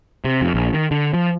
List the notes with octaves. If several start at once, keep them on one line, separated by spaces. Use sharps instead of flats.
C3
F2
A#1
D#3
D3
F3